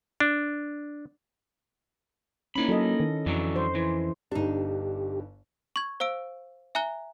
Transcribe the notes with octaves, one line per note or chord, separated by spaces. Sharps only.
D4
A#3 C#4 D#4 E4 B5
F#3 A4 D#5
D#3
F2 D3 E3 F#3
C5
E3 C5
G1 G2 D4 D#4 G4
C#6 G#6
C5 F5 E6 D7
E5 G#5 A#5 F#6 G7